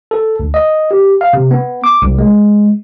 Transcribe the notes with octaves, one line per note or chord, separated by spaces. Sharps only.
A4
D2
D#5
G4
F5
C3
B3
D6
C2
G#3